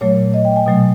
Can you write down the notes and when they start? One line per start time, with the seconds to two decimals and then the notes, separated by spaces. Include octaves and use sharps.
0.01 A#2 F#3 A3 C#5
0.34 D#5
0.45 G5
0.56 G#5
0.66 B2 F#3 A3